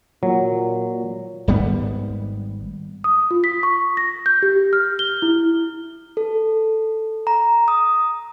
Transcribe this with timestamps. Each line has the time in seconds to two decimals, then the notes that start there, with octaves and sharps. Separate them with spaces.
0.23 A#2 F#3
1.48 G#1 G3 B3
3.04 D#6
3.31 F4
3.44 B6
3.63 C#6
3.97 A#6
4.26 G6
4.43 G4
4.73 F6
4.99 G7
5.22 E4
6.17 A4
7.27 A#5
7.68 D#6